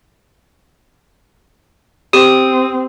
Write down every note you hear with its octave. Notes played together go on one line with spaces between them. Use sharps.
C4 G4 D#6